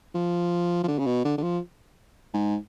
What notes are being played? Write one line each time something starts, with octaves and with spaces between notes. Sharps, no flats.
F3
F3
D3
C#3
B2
D3
D3
F3
G#2